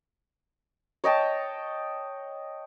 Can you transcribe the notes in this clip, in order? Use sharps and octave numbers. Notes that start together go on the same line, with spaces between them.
C#5 D#5 G5 A5